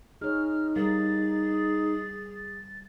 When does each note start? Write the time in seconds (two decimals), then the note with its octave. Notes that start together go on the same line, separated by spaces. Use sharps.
0.21 D#4 G#4 C#5 F6
0.76 G3 G#4 A#4 F5 A6